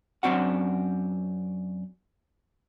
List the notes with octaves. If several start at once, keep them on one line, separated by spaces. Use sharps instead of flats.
F#2 C#3 C4 D4 F#4 F#5